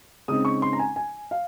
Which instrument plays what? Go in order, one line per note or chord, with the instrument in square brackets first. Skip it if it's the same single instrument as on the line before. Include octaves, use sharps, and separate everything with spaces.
[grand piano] C#3 G#3 C4 D#4 D#6
C#6
C6
A#5
G#5
G#5
F5